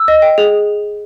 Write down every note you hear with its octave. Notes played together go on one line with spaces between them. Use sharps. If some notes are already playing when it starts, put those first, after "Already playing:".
Already playing: E6
D#5
G5
G#4